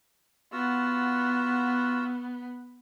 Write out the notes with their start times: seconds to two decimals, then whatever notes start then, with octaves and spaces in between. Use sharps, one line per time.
0.52 B3 F4 F#4 E6